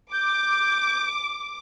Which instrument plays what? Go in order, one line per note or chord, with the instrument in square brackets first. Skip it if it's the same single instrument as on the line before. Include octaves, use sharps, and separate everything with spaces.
[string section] D6 [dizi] G6